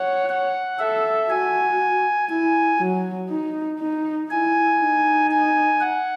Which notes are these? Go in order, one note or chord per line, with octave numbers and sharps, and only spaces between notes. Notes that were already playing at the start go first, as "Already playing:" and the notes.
Already playing: C#5 F#5
F#5
A4 E5
F#4 G#5
E4 G#5
F#3
D#4
D#4
E4 G#5
D#4
G#5
F#5